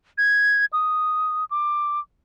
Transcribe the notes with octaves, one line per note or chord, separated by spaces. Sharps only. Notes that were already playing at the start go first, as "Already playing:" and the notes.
G#6
D#6
D6